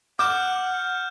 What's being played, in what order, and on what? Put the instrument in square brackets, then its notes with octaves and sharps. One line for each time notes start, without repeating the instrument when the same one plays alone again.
[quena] F#5 [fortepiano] D6 [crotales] F6 G6 E7